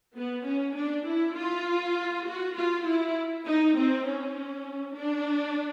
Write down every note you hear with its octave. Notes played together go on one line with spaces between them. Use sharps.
B3
C#4
D4
E4
F4
F#4
F4
E4
D#4
C4
C#4
D4